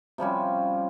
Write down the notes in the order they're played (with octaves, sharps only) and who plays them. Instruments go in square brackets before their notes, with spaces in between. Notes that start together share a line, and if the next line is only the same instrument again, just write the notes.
[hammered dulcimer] C3 F3 G3 C#4